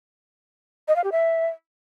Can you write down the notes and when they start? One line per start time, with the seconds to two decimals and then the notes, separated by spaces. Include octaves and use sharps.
0.88 D#5
0.96 F5
1.04 G4
1.12 E5